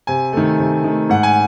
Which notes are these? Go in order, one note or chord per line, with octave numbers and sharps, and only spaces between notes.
C3 G#5
D#3 A3
C3
D#3 A3
G#2 F#5
G#5